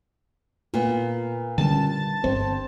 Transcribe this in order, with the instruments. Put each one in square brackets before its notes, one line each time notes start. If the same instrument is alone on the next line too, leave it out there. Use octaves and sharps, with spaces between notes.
[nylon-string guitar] A#2 B3 [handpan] F4
[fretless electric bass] D3 G3 C#4 [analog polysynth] A5
[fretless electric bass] G1 [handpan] C4 C5